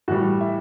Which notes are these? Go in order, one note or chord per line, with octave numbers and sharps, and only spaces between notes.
A2 E3 G3 F#4
E5